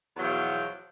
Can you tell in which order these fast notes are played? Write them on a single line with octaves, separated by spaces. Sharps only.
E2 F#3 B2 F3